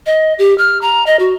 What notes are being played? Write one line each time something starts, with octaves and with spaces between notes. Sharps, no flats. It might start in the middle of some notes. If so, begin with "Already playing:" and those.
D#5
G4
F6
A#5
D#5
F#4